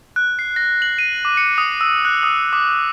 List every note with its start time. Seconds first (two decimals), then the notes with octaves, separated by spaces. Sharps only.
0.16 F#6
0.39 C7
0.56 A#6
0.82 F#7
0.99 D#7
1.25 D6
1.37 C#7
1.58 D#6
1.81 E6
2.05 F#6
2.23 D#6
2.53 D6